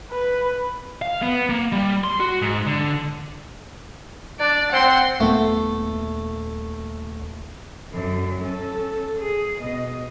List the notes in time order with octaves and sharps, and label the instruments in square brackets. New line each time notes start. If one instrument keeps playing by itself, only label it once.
[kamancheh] B4
[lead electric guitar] F5
B3
A#3
G3
C6
F#4
G#2
D3
[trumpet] D4 [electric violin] D5
[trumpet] C4 [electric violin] F#5 C6
[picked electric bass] D#1 A#2 B3 [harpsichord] A3
[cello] F#2 D3
C#4 A4
G#4
B2 D#5